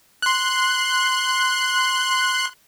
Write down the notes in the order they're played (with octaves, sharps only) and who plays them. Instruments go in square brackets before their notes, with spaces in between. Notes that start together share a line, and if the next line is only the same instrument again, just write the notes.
[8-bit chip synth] C6 F#6